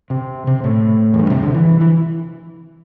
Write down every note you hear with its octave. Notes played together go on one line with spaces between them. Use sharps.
C3
C3
A2
E2
G2
A2
C3
D3
E3
E3